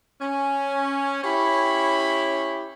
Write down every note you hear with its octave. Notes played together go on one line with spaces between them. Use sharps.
C#4
C#4 E4 G4 C#5 B5